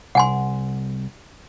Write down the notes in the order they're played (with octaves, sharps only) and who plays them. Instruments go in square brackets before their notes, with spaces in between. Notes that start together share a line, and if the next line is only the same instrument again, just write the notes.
[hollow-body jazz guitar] C2 [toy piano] F#5 G#5 C6